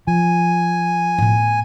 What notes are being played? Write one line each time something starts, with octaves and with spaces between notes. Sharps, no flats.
F3 G#5
A2 B3